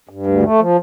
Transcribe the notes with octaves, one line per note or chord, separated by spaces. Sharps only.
G2
D2
A3
F3